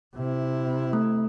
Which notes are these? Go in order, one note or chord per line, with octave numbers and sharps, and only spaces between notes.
C3 E4
A3